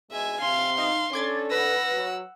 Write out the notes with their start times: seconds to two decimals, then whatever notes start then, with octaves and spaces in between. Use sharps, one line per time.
0.11 B2 G#3 E5 G#5
0.41 C3 C4 F5 C6
0.78 D#4 F5
1.13 C#4 D4 A4 D6 G#6 A6
1.51 B4 F#5 E6 A#6
1.92 F#3